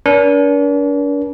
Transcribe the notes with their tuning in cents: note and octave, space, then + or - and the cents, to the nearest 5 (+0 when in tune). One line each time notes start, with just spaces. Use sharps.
D4 -45 A#4 +45